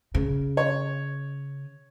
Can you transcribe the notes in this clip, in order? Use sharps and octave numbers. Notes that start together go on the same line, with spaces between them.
C#3
C#5